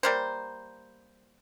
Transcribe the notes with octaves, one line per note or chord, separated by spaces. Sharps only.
G3 A#3 C5